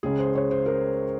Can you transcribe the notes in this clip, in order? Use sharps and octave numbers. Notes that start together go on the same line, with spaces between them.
C#2 C#3 G#3 G#4
C5
C#5
C5
A#4